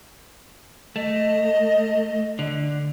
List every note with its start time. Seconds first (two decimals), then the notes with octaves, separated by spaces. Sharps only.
0.96 A3 D#5
2.39 D3